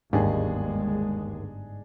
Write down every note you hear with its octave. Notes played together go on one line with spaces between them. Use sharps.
G1 D#2 G#2 G#3 D4 D#4 G#4